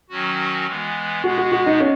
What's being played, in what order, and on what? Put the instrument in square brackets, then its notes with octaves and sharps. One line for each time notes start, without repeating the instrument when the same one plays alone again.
[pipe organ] D#3 F#3 C#4 F#4
E3 G#3 B3
[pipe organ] B2 G#3 B3 [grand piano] F#4
[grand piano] F#4
F#4
D#4
C#4